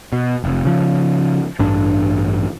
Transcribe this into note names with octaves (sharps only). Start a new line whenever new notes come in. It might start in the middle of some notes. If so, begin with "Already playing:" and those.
B2
F1
C#3 F3
A1 G2 D4